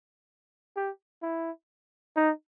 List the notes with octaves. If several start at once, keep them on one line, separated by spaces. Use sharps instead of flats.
G4
E4
D#4